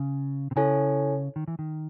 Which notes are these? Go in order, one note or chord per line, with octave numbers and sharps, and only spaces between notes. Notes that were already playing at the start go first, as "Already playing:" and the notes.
Already playing: C#3
C3
C#3 E4 A4 C#5 G#5
D#3
E3
D#3